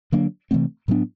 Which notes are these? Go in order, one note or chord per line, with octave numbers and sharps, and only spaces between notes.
D3 F#3 A#3 D4
C3 E3 A3 C4
A2 F#3 B3 D4